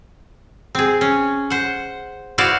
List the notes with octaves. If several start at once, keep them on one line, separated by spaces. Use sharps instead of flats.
C4 G#4
C#4
C5 F#5
E4 F#4 B4 C5 D5 F5